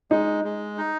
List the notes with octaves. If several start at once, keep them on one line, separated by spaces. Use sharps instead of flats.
G#3 D#4
G#3
D#4